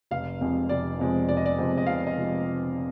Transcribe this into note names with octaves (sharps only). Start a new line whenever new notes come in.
F1 F5
F2 C3 F3 G#3
F1 D5
F2 C3 F3 G#3
F1 D5
D#5
D5
F2 C3 F3 G#3
D#5
F1 F5
D#5
C3 F3 G#3